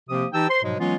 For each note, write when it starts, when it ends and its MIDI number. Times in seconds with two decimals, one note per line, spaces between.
0.09 0.26 48
0.09 0.26 53
0.09 0.26 58
0.09 0.26 60
0.09 0.26 67
0.09 0.26 87
0.33 0.46 52
0.33 0.46 63
0.33 0.46 67
0.33 0.46 79
0.33 0.46 81
0.33 0.46 88
0.49 0.62 72
0.49 0.62 84
0.63 0.77 44
0.63 0.77 47
0.63 0.77 53
0.63 0.77 54
0.63 0.77 56
0.78 0.96 52
0.78 0.96 54
0.78 0.96 56
0.78 0.96 59
0.78 0.96 61
0.78 0.96 65